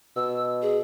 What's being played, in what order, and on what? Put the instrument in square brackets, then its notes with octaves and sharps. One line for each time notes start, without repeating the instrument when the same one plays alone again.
[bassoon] B2 [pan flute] E6
[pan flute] G#4